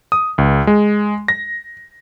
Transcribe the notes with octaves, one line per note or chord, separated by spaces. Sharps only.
D#6
C#2
G#3
A#6